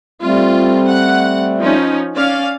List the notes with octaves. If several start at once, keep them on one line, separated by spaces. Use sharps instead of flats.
G3 A3 C4 F4
F#5
F3 C#4 D#4
C#4 D5 F5